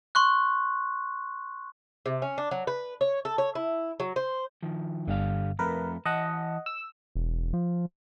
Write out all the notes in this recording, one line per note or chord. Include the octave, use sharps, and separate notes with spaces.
C6 C#6 F#6
C3
C#4
D4
F#3
B4
C#5
A4
C#5
E4
F#3
C5
D#3 F3
G1 D3 G3 F5
F2 A3 A#4 B4
E3 D#5 F#5 A5
E6
E1
F3